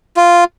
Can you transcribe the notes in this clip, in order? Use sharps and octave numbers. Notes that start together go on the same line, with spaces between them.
F4